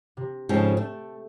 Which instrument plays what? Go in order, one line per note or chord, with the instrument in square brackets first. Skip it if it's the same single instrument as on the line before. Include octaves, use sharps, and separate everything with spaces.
[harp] C3
[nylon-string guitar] G#2 C#3 F3 [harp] A4 G5
[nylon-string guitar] A3 [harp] E7